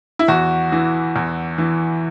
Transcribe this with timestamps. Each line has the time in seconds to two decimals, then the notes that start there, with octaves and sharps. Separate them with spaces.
0.19 E4
0.28 E2 F#4
0.72 E3
1.16 E2
1.58 E3